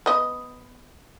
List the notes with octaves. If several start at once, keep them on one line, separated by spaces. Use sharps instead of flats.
B3 D#5